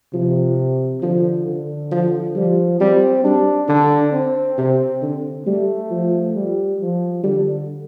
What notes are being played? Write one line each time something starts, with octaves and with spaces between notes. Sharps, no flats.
C3 F3
D3 F3
D3
F3
F3 G3
G3 C4
G3 D4
D3 D4
C4
C3
D3
G3 A3
F3
G3
F3
D3 G3